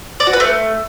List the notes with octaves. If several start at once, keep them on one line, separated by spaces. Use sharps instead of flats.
D5
F#4
B4
A3